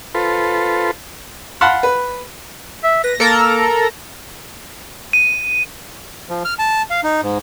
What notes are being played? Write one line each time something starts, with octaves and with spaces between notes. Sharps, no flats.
F4 A4 B4 C5
F5 F#5 A5 B5 C6
B4
E5
B4 A#6
A#3 A4 A#4 A#5
D#7
F3
F6
A5
F5
D#4
G#2